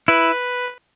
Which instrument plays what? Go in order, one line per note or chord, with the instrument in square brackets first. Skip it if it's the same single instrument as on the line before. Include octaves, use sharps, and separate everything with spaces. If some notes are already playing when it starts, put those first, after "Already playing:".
[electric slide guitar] E4 [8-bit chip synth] B4